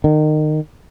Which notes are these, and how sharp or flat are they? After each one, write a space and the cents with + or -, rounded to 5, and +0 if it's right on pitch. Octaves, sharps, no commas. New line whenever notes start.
D#3 -25